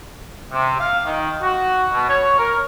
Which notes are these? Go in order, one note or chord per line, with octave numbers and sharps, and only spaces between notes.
C3
F5
D#3
F#4
B2
C#5
A#4